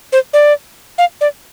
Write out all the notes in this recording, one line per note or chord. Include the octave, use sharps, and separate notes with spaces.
C5
D5
F5
D5